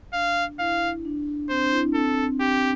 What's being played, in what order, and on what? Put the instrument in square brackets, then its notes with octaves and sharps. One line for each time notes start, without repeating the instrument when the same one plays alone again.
[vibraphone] D4 [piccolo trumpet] F5
[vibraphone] E4 [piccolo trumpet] F5
[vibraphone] D4
[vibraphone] C4 [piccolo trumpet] C5
[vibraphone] D4
E4
D4
[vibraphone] C4 [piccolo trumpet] A4
[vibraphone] C4 [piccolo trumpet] G4